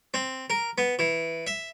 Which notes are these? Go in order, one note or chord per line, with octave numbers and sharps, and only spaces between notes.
C4
A#4
B3
E3
E5